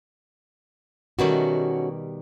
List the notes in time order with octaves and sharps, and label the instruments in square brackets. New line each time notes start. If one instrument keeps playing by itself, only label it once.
[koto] B2 D#3 G3 [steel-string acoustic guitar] A3 C#4 F#4